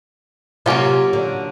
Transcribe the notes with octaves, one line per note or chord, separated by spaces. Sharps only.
C3 F#3 A#3 C#4 F4
D3